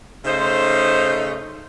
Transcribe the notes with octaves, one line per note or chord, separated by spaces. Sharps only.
C#3 A3 D#4 C5